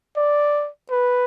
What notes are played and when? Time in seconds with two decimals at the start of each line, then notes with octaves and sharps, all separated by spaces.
0.17 D5
0.90 B4